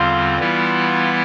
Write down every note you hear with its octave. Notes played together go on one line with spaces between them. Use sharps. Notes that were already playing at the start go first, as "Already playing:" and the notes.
Already playing: E2 D3 G3 C4 F4
E3 G3 B3 E4